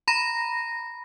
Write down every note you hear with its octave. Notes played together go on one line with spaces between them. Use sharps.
A#5 B5 A#6